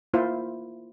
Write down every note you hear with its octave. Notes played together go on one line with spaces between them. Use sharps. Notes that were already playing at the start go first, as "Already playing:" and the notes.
A#3 E4 F4 C5